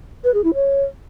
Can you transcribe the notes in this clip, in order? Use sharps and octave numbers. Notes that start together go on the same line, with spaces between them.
B4
G#4
E4
C#5